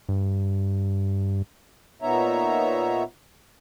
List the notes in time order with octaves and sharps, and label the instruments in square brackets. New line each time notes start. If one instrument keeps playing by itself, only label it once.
[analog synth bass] G2
[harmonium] A#2 B3 D#4 C#5 E5 A#5